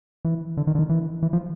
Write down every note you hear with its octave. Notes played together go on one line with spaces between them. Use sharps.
E3
D3
D#3
D3
D#3
E3
E3
F3